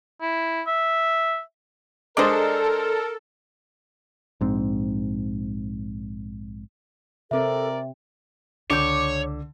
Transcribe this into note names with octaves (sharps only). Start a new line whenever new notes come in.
E4
E5
G#3 D4 A4 A#4 C5 D5 D#5
A#1 G#2 C4
C3 C4 A4 A#4 D5 E5
C#2 D3 C#5 D6 E6 G6